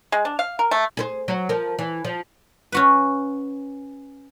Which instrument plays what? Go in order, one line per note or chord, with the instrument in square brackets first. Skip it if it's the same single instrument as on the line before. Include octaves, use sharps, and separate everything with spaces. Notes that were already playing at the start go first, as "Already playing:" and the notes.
[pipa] G#3
D4
F5
A#4
A3
[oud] G#4 B4 C5
F#3
F3 A#4
E3
F3
[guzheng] C#4 F#4 B4